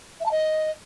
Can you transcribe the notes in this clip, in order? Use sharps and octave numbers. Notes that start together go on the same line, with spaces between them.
E5
A5
D#5